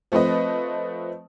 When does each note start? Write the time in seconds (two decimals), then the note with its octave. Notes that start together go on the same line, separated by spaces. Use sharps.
0.12 F3 A3 C4 B4 D#5